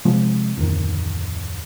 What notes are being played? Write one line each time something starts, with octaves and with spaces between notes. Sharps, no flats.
C3 F3 G#3
D1 F2 D#3